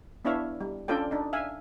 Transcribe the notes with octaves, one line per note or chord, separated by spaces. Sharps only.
B3 D4 E4 C#5 E5 F5
G3
C#4 D4 F4 A4 D5 G5
D4 D#4
E5 F5 G#5